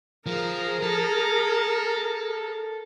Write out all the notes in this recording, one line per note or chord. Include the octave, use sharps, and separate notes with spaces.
F3 G#4 A#4
A4